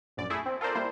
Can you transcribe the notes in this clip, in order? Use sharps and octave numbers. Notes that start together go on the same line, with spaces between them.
A#1 F#2 D5
A3 E4 G#4
C4
F4 A4 A#4 C5 D5
G3 A#3 E4 C5